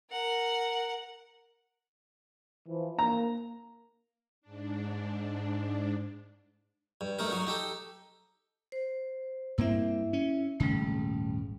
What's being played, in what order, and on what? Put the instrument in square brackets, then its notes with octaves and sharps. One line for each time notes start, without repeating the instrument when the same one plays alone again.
[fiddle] A#4 F#5
[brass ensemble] E3 F3
[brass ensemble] A#3 [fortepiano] A#5
[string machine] G#2 D4
[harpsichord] G2
G2 A3 D#4 A#4
F#3 D#4 F#4
D#4 G4 A4
[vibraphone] C5
[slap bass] G2 A#3 C4 [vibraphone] E4 E5
[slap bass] C#4
[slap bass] D#1 G#1 C#3 [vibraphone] G3 A3